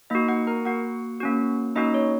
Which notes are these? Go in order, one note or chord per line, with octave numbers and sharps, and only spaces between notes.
A#3 D#4 F#4 D#5
F#4 F#5
A#4 A#5
A#3 F#4 F#5
A#3 C#4 F#4
A#3 C#4 D#4 F#4 D#5
C#5